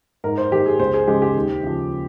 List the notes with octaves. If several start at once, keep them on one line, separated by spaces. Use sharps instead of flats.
G#2 A#4
C5
D#3 A#3 G4
G#4
C#2 C5
G#4
C#3 G#3 G4
G4
D#2
C#3 F3